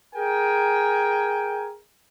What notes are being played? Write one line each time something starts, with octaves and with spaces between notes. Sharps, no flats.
G#4 A#4 G5 G#5